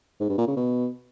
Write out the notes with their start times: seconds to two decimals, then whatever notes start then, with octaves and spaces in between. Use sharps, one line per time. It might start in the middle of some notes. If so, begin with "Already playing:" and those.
0.20 G#2
0.29 G2
0.38 A#2
0.47 C#3
0.56 B2